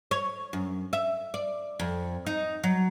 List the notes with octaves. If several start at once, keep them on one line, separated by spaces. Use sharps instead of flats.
C#5
F#2
E5
D5
F2
D#4
F#3